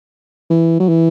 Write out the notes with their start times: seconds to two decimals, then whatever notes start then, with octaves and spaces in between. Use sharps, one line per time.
0.50 E3
0.80 F#3
0.89 E3